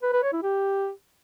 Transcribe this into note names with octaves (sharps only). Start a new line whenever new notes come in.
B4
B4
C#5
E4
G4